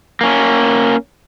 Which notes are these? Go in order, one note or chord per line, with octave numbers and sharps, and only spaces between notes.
A#3 C#4